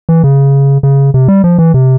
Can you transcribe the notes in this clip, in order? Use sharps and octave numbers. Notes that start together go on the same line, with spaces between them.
E3
C#3
C#3
C3
G3
F3
E3
C3